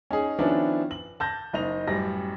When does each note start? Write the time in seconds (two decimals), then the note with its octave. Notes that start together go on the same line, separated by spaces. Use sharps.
0.11 C#4 D#4 G#4
0.38 D#3 F3 B3 C#4 D4 E4
0.91 F#7
1.20 A5 G6 A#6
1.53 F#1 D#4 D#5 F7
1.88 A1 F#2 G3 A#6